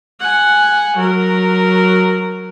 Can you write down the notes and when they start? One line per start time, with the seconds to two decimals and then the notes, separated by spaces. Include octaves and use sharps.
0.20 F#5 G#5
0.97 F#3 A#4